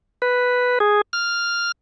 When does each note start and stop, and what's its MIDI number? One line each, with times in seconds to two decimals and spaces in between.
0.22 0.79 71
0.80 1.01 68
1.13 1.72 89